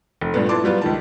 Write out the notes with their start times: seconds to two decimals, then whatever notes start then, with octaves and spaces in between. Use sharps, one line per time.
0.21 F1
0.34 G2 A#2 B3
0.49 B3 E4 A5 C6 D6
0.64 F#3 G3 B3 F4
0.82 C#2 D#3 A5